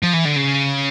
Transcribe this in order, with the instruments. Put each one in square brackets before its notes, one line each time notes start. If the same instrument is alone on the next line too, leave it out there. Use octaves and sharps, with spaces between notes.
[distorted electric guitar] F3
E3
D3
C#3